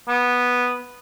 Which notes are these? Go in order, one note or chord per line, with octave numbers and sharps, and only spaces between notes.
B3